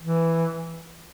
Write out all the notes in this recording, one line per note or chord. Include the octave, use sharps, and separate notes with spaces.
E3